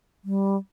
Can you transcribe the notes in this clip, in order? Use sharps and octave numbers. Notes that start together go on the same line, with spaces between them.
G3